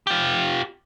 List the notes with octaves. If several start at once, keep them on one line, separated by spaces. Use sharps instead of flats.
F4 G4